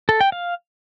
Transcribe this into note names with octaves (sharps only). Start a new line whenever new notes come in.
A4
G5
F5